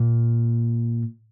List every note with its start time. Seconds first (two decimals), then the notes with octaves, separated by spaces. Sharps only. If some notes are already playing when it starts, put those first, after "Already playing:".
Already playing: A#2